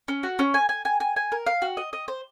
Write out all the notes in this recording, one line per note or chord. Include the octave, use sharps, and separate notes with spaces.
C#4
F#4
C#4
G#5
G#5
G#5
G#5
G#5
A#4
F5
F#4
D#5
D#5
C5